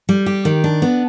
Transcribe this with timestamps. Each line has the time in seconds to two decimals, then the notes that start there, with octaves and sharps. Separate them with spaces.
0.09 G3
0.26 G4
0.45 D#3
0.64 D4
0.82 B3